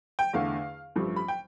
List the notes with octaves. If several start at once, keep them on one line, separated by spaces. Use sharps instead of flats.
G5
E2 D3 A3 F5
A1 G2 F3 A3
B5
G5